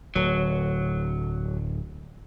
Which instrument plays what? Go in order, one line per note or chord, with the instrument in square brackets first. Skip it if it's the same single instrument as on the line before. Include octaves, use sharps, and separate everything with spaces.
[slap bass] D1 [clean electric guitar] F#3